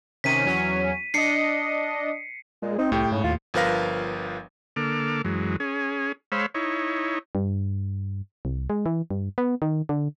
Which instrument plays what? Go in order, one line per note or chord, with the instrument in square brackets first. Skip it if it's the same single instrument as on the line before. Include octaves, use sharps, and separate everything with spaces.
[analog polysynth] C3 D#3 C#4 [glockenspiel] B6 D#7
[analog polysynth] E2 F#3 C#4
[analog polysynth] D4 D#5 [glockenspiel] C7 C#7
[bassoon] A#2 [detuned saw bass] G#3
[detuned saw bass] C4 [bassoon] D#4
[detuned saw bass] C2 [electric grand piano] A2 [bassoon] G4
[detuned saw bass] G#2 [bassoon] C#3
[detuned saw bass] D#2 [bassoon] F4
[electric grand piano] G1 F3 A#4 B4 F5 A#6
[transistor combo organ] D3 A#3 A4 D6 F6
F#2 E3 F#3 G#3
C#4 G#4
G#3 C5 C#5 F5 B5 E6
D#4 E4 C#5
[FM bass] G2
C2
G#3
E3
G2
B3
D#3
D3